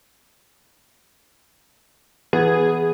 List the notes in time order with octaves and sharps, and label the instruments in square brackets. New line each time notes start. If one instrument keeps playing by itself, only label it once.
[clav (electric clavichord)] E3 B3 [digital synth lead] G#4